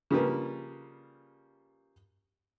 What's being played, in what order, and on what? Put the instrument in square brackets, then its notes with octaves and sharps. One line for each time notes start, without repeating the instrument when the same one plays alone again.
[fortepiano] C#3 F3 G3 A#3 B4